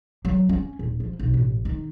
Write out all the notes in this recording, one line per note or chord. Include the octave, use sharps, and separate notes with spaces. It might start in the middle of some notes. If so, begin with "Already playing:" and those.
F#3
C#4
D#1
F3
B1
A1
D#3